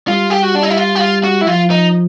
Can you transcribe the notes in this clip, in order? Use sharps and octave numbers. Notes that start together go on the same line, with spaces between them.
G3 F4
G4
F#4
D4
D#4
E4
F4
F#4
F4
F#4
E4
F3 F4
D#4